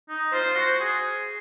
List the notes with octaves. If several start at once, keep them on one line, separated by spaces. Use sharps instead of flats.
D#4
F4 C5
F#4
G#4